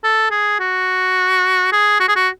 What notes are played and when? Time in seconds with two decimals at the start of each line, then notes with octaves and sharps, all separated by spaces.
0.04 A4
0.31 G#4
0.59 F#4
1.72 G#4
2.00 F#4
2.08 G#4
2.16 F#4